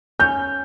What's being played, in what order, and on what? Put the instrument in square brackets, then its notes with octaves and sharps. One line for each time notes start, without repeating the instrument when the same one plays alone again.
[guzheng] C#4 [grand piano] G6